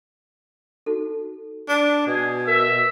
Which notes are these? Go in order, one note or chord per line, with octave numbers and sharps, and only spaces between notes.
D#4 F#4 A4
D4
B2 G#4
A#4 E5